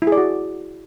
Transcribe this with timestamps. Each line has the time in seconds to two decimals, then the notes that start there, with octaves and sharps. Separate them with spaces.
0.02 E4
0.07 G#4
0.12 D5
0.17 F#4